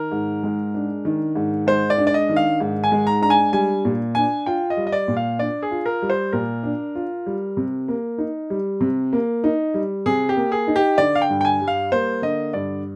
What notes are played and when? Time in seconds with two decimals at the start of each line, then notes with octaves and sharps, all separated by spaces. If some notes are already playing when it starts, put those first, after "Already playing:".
Already playing: D#3 A#4
0.11 G#2
0.43 G#3
0.74 D4
1.05 D#3
1.35 G#2
1.67 G#3 C5
1.90 D5
1.98 D4
2.07 D5
2.14 D#5
2.29 D#3
2.36 F5
2.60 G#2
2.84 G#5
2.92 G#3
3.07 A#5
3.22 D4 A#5
3.30 G#5
3.53 G3 G#5
3.85 A#2
4.15 D4 G#5
4.46 F4 G5
4.70 D#5
4.77 G3
4.87 D#5
4.92 D5
5.08 A#2
5.17 F5
5.39 D4 D5
5.63 G#4
5.71 F4
5.86 A#4
6.02 G3
6.10 C5
6.32 A#2 A#4
6.63 D4
6.95 F4
7.26 G3
7.57 C3
7.88 A#3
8.18 D#4
8.50 G3
8.81 C3
9.13 A#3
9.44 D#4
9.74 G3
10.06 C3 G#4
10.29 G4
10.36 A#3
10.52 G#4
10.68 D#4
10.76 G4
10.98 D3 D5
11.15 F5
11.22 G5
11.29 G2
11.41 G5
11.45 G#5
11.61 G3
11.68 F5
11.92 A#3 C5
12.22 D3 D#5
12.54 G2 D5